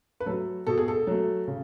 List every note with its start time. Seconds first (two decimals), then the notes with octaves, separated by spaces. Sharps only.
0.20 B4
0.26 F#3 A3 A4
0.67 B2 A4
0.78 G#4
0.88 A4
1.07 F#3 A3
1.48 C#3